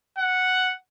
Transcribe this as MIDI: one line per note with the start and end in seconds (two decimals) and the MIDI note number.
0.18 0.73 78